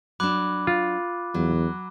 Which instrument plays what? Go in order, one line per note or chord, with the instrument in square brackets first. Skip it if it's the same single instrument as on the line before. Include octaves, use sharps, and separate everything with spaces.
[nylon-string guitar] F#3 D4 [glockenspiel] B5 D6 F#6
[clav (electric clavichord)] F4
[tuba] E2 [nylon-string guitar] F#3